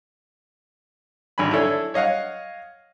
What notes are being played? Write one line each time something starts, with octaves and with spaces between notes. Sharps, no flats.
G#1 D3 G#5 B5
D4 E4 A4 C#5 G#5
C#5 D#5 F5 F#5